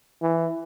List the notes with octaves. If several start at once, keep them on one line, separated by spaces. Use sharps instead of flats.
E3